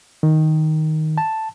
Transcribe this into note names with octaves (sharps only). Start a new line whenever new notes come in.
D#3
A5